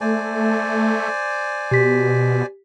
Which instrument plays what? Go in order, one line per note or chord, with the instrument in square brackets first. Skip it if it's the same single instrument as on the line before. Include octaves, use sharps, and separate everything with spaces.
[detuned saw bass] A3 [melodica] C5 D5 G#5
[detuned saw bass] B2 [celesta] G4 B6